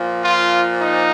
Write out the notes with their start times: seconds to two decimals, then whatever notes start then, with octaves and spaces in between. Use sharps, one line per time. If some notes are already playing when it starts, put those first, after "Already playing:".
Already playing: A#2 F3
0.24 F4
0.82 D#4